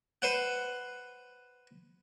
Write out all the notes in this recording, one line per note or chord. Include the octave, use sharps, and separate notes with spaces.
B4 C5 F#5